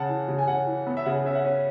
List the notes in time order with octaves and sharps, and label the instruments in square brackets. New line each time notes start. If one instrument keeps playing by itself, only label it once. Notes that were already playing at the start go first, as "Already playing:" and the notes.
Already playing: [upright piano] C#3 F#5 A5
E3
C#3
G#5
C#3 F#5
E3
B3
E5
C#3 F#5
C#4 E5
F#5
C#4